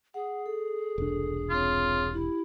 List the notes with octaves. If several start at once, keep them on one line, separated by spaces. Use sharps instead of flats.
G#4 F#5
A4
E1 C2 D4
C4 F4 C#5
E4 G4